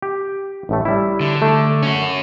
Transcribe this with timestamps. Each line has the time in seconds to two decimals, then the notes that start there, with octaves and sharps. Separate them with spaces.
0.02 G4
0.69 A1 A2 A3
0.85 G3 E4
1.21 D3
1.42 A3
1.83 C#4 F#4